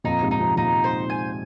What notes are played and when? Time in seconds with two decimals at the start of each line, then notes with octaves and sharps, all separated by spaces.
0.04 F2 A#2 D#4
0.22 G#2 C3
0.31 D#4
0.39 C3 F3
0.57 A#2 D#3 D#4
0.84 C5
1.10 G#5